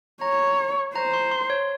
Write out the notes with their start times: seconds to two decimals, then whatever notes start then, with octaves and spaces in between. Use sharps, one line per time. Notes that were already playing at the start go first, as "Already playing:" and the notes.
0.21 C#5 A#5
0.95 C5 A#5
1.14 C6
1.32 C6
1.50 C#5